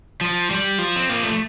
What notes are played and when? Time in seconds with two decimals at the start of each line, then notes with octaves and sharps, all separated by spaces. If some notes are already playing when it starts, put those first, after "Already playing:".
0.21 F3
0.51 G3
0.78 F3
0.96 C4
1.09 A#3
1.23 A3